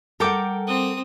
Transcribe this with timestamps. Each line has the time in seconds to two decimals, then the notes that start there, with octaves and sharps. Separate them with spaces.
0.20 G3 A4 A#4 F#5 G5 D6
0.67 C4 D#6